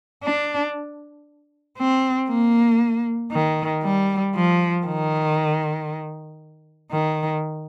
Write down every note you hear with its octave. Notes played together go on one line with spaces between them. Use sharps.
D4
C4
A#3
D#3
G3
F3
D#3
D#3